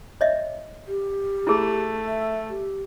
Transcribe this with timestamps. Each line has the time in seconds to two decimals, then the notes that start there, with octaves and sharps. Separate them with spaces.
0.21 C#5 D#5 E5
0.87 G4
1.47 A3 E4 G#4
2.08 E5
2.49 G4